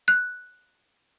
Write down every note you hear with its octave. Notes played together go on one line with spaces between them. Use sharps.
F#6